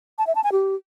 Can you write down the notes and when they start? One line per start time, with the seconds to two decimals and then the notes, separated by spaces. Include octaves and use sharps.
0.18 A5
0.27 E5
0.35 A5
0.44 G#5
0.52 G4